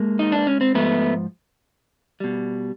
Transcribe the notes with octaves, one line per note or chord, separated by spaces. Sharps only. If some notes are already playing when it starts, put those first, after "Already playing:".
Already playing: G#3 A#3
D#4
D4
C#4
C4
G#2 F3 A3 B3
B2 G3